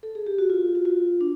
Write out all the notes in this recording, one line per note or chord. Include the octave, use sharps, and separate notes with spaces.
A4
G#4
G4
F#4
F4
F#4
F4
D4